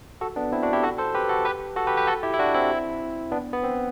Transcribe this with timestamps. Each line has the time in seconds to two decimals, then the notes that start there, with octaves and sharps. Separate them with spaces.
0.21 F#4 A4
0.36 B3 D4
0.52 C4 E4
0.63 D4 F#4
0.73 E4 G4
0.83 F#4 A4
0.98 A4 C5
1.14 G4 B4
1.29 F#4 A4
1.45 G4 B4
1.76 F#4 A4
1.87 G4 B4
1.97 G4 B4
2.07 F#4 A4
2.23 E4 G4
2.34 E4
2.39 D4 F#4
2.54 C4 E4
3.32 B3 D4
3.53 B3
3.63 C4